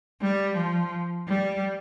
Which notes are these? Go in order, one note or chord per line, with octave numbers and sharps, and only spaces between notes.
G3
F3
G3